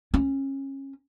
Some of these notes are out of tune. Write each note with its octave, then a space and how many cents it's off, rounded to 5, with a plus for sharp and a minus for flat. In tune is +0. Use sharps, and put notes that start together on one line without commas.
C#4 -25